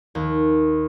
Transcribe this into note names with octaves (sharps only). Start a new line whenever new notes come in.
D#2